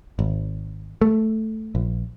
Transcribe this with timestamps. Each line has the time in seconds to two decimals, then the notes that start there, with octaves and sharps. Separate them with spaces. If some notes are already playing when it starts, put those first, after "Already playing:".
0.19 G#1
1.01 A3
1.75 A#1